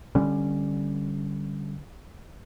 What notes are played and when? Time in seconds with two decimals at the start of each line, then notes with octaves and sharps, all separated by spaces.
0.15 D3 G3 C#4